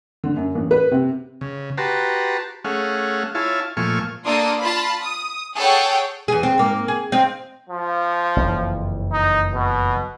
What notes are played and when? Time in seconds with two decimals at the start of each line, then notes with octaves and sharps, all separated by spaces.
0.24 D3
0.36 F#2
0.55 A1
0.71 B4
0.91 C3
1.41 C#3
1.78 F#4 G4 B4 A5 A#5 C6
2.65 A3 C#4 G#4 F5 F#5
3.35 E4 F4 C#5 F5 G#5 A5
3.77 A#2 F3 A3 G#5 C#6 F6
4.25 A#3 D4 F4 A4 D#6
4.60 F4 A5 B5
5.01 D#6
5.55 G#4 A4 C#5 F#5 G5
6.28 E2 G#4
6.43 C4
6.58 G#2 A#3
6.88 G#4
7.12 C4 D#5 F5
7.69 F3
8.36 F#1 F2 E3
9.12 D#4
9.54 B2